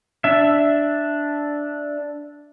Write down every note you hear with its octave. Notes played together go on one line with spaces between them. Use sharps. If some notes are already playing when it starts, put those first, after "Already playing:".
D4 E5